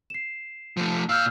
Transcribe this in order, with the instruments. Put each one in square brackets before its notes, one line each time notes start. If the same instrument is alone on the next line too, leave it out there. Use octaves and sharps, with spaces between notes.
[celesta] C7 E7
[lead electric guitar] F3 A3
[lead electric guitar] A#2 F5 [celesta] E6 F6 G6